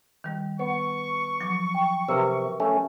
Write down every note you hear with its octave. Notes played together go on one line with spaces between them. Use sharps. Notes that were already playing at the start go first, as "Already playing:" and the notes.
D#3 G3
B3 C#6
F3 F#3 D6
G5
C3 A#4 B4 E5
A3 C#4